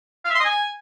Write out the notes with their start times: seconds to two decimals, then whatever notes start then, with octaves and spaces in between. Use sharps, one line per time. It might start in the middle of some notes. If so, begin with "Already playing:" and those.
0.25 F5
0.30 E5
0.35 C6
0.40 D#5
0.45 G#5